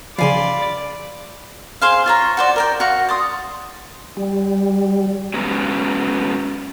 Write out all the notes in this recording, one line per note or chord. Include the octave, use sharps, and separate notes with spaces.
C#3 F3 D5 F5 G#5 B5 C6
G#4 C5 F5
F4 C#5 A#5
F#4 C5 D5
A#4 D5 G5
F#4 F5 C#6
D5 C6 D#6
G3
F#3 G#3 B3 C#4